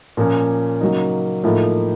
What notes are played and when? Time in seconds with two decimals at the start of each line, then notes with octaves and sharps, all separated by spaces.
0.17 A#2 F3 A#3 C#4
0.81 C#3 F#3 A#3 D#4
1.44 A2 F3 A#3 D#4